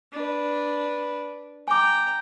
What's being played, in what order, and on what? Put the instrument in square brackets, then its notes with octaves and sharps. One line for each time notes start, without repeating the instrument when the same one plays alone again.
[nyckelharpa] D4 B4
[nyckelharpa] G5 A#5 [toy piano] G#5 D6